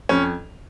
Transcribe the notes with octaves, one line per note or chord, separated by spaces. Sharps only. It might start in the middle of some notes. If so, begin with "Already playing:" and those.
F2 C#4